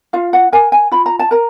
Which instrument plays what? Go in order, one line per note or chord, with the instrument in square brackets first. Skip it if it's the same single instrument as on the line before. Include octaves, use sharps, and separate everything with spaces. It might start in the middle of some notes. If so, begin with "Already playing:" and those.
[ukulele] F4 F5
F#5
A#4 G#5
G#5
F4 B5
A#5
A5
A#4 A#5